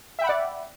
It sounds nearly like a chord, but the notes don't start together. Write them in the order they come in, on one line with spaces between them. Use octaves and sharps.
E5 G5 B5 F#5 D5